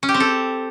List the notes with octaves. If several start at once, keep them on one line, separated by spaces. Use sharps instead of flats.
C#4
G4
C4
A4